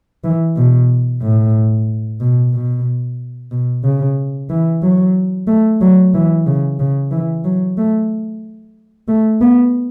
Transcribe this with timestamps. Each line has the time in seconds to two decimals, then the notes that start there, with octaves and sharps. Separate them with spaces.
0.24 E3
0.57 B2
1.22 A2
2.21 B2
2.54 B2
3.51 B2
3.85 C#3
4.50 E3
4.82 F#3
5.47 A3
5.81 F#3
6.14 E3
6.47 C#3
6.80 C#3
7.11 E3
7.45 F#3
7.78 A3
9.08 A3
9.41 B3